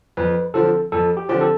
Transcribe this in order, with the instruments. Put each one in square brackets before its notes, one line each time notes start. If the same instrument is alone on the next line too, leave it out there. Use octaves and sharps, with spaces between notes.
[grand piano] F2 [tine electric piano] B4
[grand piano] D3 F3 C4 [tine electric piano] A4
[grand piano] F2 [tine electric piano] A4
[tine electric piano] G4
[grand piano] D3 F3 C4 [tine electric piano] G4
[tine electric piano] A4